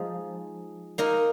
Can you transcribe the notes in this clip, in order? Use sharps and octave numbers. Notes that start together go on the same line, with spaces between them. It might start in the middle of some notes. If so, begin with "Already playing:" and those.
Already playing: F3 G#3 D#4 G#4
A#3 D#4 A#4 D#5